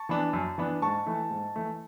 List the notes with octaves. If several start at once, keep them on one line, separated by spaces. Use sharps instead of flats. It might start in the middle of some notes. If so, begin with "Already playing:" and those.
Already playing: A5 C#6
E3 B3 D4
F#2
E3 B3 D4
G#2 A5 C#6
E3 A3
G#2
E3 A3